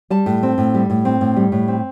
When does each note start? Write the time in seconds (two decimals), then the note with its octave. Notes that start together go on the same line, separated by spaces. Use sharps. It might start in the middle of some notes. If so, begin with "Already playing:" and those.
0.10 G3 A5
0.26 A2
0.43 C4
0.58 A2
0.74 G3
0.90 A2
1.05 C4
1.21 A2
1.36 G3
1.52 A2
1.68 C4